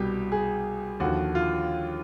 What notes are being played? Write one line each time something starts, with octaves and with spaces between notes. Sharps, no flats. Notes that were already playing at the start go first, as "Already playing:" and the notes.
Already playing: C2 B2 G3 G4
G#4
D#2 D3 F3 F#4
F4